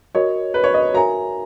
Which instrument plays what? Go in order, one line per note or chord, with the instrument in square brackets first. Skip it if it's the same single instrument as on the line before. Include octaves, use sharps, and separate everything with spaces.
[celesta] F#4 A#4 D#5 [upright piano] C#5
[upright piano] B4
C#5
D#5
[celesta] F#4 A#4 E5 G#5 [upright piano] A#5